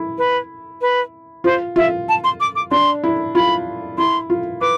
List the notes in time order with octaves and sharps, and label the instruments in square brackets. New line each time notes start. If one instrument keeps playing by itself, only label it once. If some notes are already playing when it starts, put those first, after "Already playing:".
Already playing: [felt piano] E4
[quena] B4
B4
[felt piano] F4 [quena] C5
[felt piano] F4 [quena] E5
[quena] A5
C6
D6
D6
[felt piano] D4 [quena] C6
[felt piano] E4
[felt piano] F4 [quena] B5
[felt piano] E4 [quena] C6
[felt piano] F4
[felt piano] B4 [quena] D6